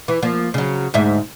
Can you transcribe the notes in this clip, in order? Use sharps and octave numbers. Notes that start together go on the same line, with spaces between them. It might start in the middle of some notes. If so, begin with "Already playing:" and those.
E3
F3 A#3
C#3 F#3
D2 G#2 E5